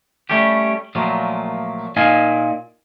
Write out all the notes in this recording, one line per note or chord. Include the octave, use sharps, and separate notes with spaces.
G3 A3 C#4 G4
A#2 F3 F#3 A3 A#3
A#2 D#4 F5 G#5 A5